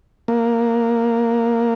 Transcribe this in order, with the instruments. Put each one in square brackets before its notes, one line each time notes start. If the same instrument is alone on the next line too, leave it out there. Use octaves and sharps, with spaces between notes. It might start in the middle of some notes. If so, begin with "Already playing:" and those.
[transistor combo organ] A#3